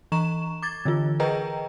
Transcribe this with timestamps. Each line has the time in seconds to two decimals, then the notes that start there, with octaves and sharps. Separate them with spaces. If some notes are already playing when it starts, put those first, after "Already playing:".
0.12 E3 A#5 C#6 E7
0.62 D6 G#6 A6
0.85 D3 E3 F4
1.20 G#4 A#4 B4 D#5 G5 A#5